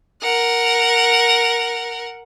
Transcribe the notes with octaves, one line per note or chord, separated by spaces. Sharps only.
A#4 F#5